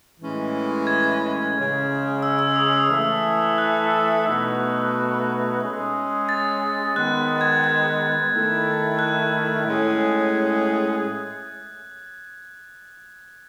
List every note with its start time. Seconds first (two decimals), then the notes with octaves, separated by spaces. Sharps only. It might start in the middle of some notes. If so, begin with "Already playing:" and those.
0.19 A2 E3 G#3 C#4
0.87 G#6
1.55 C#3 G#3 C#4
2.23 E6
2.39 E6
2.56 D#6
2.73 D#6
2.90 E3 A3 E4 A4
3.58 F#6
4.25 B2 A3 D#4 F#4 B4
5.61 G#3 C#4 G#4
6.29 A6
6.96 D#3 G#3 B3 F#6
7.41 G#6
7.64 G#6
8.31 D#3 A3 E4 A4
8.99 F#6
9.66 A2 G#3 C#4 G#4